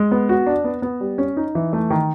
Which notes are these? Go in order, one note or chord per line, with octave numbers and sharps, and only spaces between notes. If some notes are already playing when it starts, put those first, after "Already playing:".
Already playing: G#3
B3
F#4
D4
B3
B3
G3
C#4
D#4
E3
A3
D#3